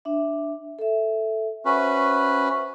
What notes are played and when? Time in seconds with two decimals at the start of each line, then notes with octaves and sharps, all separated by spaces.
0.05 D4 E5
0.79 A4 E5
1.66 C#4 F#4 B4 C5 E5